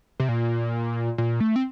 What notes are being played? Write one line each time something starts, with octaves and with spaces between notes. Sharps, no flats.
C3
A#2
A#2
A3
C4